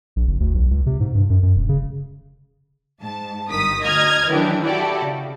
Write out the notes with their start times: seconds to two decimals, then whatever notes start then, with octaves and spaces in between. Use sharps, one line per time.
0.16 A#1
0.27 F#1
0.40 D2
0.55 B1
0.71 C#2
0.86 C3
1.00 G#2
1.15 G2
1.30 F#2
1.43 F#2
1.55 E1
1.69 C#3
3.00 G#2 A5
3.50 G1 G2 D#3 D#6 B6
3.82 D2 D#5 A#5 D#6 F6 G#6
4.29 D#3 E3 F#3 C#4 D4 G4
4.64 E4 F#4 G4 A4 D5
5.01 C#3